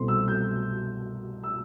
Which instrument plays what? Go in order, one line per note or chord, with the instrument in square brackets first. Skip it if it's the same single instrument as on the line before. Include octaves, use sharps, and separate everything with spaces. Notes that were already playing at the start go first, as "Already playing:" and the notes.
Already playing: [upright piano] C2 B2 A3 C4 C6
E6
G6
E6